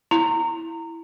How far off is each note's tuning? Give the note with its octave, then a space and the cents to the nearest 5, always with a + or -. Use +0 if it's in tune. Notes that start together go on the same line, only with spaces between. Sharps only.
E4 +0 A#5 -20